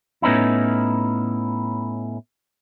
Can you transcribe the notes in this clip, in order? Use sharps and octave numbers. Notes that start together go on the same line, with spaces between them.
A2 B3 C#4 D#4 E4